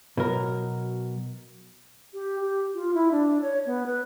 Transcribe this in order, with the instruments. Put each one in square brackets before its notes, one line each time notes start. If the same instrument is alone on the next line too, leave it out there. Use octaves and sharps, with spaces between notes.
[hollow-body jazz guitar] B2 F#3 A#4
[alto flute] G4
G4
F4
E4
D4
C#5
B3
B4